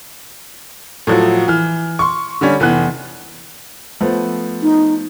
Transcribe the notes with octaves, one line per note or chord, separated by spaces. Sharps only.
A2 F3 F#3
E3 F6
C6 C#6
D3 G3 C#4
F1 E3 B3 F#6
F3 A3 B3
D#4